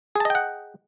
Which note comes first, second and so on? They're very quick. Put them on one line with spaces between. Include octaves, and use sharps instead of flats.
G#4 A5 D#5 G5 F#5